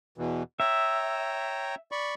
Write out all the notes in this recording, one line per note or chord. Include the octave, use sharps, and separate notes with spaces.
E2 B2 E3
C#5 E5 G5 A#5
D5 B5 C#6